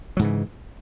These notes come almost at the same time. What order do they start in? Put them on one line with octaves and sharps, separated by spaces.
F#3 G#2 C#3 E3